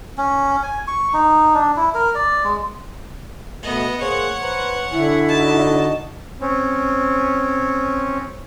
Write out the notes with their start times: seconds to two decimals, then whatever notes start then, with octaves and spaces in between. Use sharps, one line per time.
0.18 C#4
0.63 G#5
0.88 C#6
1.13 D#4
1.55 D4
1.77 E4
1.95 A#4
2.15 D5
2.44 G#3
3.62 B2 A3 B3 D#5
4.00 A#3 G#4 C5 C#5 F#5
4.42 B4 C5 A#5
4.92 D3 E4 G#5
5.28 D#4 F#4 D#5 A5
6.41 C4 C#4